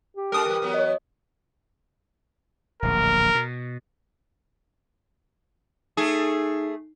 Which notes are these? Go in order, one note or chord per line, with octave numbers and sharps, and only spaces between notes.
G4
G#3 D4 A4 A#4 D#6
E3 G3
E3 F#3 B3
C#5 D#5
D1 A#1 A#4
B2
A3 D#4 G#4 C7